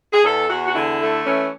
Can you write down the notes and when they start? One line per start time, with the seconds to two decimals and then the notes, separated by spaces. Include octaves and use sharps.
0.12 G#4
0.24 E2 A4
0.49 E2 F#4
0.68 F#4
0.75 D3 E4
1.00 A3
1.25 E3 C#4